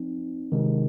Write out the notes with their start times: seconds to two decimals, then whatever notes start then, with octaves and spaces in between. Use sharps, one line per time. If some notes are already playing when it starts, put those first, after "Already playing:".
Already playing: F3 C4 D#4
0.52 C3 D#3 G#3